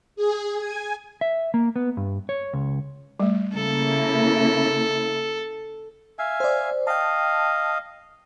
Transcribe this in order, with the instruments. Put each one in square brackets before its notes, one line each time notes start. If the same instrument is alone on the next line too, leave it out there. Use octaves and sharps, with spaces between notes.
[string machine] G#4
G#5
[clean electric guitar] E5
A#3
B3
G2
C#5
C#2
[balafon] G3 A3
[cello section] C#3 A#3 E4 [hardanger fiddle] A4
[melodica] E5 F5 G#5
[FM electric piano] C5 D5
[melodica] D#5 F5 [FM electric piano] G5 A5